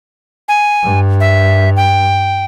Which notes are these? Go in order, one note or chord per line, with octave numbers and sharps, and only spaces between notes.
G#5
G2
E5
G5